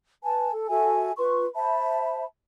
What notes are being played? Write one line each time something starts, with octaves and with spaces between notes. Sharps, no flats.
B4 G#5 A5
A4
F#4 A4 E5 G#5
F4 B4 C6 C#6
C5 E5 A5 B5